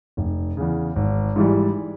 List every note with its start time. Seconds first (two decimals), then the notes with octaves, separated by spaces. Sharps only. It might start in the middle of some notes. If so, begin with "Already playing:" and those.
0.17 F1
0.57 E2 C#3
0.96 G#1
1.36 G#2 E3 G3